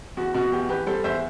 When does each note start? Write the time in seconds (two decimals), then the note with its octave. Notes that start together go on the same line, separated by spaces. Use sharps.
0.17 E2 F#4
0.34 B2 F#4
0.52 E2 G4
0.69 E2 G4 B4
0.86 G3 A4 C5
1.04 E2 C5 E5